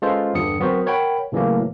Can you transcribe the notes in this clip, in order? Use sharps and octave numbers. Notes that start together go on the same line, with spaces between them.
G#3 C#4 F4 A4 B4 C5
E2 G2 D3 D#6 C#7
F#3 B3 C4 F#4 A#4 C5
A#4 C#5 F#5 G5 B5
A2 C#3 E3 F#3 A3 A#3